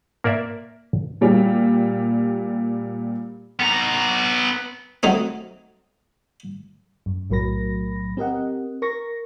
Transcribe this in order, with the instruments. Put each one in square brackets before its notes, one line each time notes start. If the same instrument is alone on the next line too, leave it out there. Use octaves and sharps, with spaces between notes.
[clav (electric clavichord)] A#3 A#4 D5 E5
[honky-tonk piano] A#2 G3
[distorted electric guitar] B3 A#5
[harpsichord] F#3 A3 C4 D#4
[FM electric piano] F#2
B1 A2 F#3 A#4 B5 A#6
C4 G4 A#4 D#5 F#5
A#4 C#6 A#6